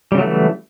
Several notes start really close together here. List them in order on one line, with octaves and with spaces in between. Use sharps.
G3 C#3 F#3 A3 E3